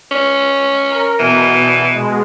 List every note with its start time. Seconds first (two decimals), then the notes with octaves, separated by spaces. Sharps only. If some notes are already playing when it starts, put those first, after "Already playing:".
0.11 C#4
0.90 A#4
1.20 B2 E3
1.94 B2 G#3